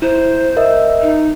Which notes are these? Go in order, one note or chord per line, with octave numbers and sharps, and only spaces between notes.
E4 C5
A#4 D#5 E5
D#4